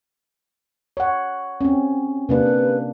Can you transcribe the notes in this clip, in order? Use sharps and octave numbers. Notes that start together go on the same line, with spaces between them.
C#5 F#5
C4 C#4
C3 A#3 D4 B4